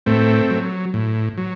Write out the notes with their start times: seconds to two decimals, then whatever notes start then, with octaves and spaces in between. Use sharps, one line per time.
0.06 A2 A3 C4
0.50 F#3
0.94 A2
1.38 F#3